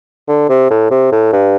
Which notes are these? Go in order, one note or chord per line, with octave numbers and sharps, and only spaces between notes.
D3
C3
A2
C3
A2
G2